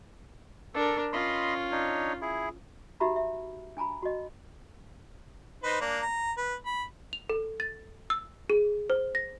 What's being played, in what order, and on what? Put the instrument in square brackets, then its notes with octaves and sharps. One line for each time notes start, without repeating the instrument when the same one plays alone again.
[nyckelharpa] D4 A#4 [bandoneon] A4
[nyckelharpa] C#4 F4 [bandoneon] D#5 B5 C6
[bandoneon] D4 D#4 C#5
E4 G#4
[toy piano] D#4 F#4 G4 E5 A#5 B5
E5
D4 G#5 A#5 B5
F#4 D#5
[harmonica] D#4 B4 C5
A#3 D4
A#5
B4
B5
[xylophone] F7
A4
A6
E6
G#4
C5
A#6